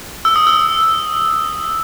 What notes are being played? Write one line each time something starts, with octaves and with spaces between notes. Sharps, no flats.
E6
D#6
E6